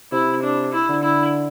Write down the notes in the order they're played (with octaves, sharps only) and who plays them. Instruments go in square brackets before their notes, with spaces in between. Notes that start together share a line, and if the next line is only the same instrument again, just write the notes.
[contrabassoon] C3 [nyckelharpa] E4
[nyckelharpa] D4
E4
[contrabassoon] D3
[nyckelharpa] E4